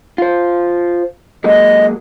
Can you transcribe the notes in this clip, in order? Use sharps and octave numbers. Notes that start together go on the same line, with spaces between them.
F4 C5
F#3 G#3 A#3 D#5